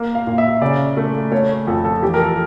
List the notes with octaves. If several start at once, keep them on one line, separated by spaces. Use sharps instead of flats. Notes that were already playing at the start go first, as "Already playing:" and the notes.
Already playing: A#3
F5
A#2
E5
C#3 D5
A3
A3 C#5
F2 A4
A4
E3 G4
A#4
A4